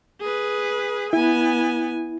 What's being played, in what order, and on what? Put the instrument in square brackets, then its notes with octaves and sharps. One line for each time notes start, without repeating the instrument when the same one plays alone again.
[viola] G#4 B4
[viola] B3 G#5 [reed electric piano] E4